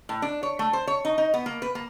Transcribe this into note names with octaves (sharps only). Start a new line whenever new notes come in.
A2
D4
C#5
A3
C5
C#5
D#4
D#4
B3
A#3
B4
A#3